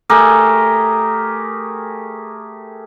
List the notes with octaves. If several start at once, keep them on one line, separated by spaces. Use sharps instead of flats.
A3 G4 G#4 A#4